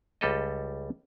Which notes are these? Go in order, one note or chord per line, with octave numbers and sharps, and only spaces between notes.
C#2 G3 A4 D#5